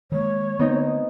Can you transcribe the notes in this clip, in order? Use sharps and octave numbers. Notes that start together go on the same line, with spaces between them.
D#3 G#3 A#3 C#5
D3 A3 B3 C4 D#4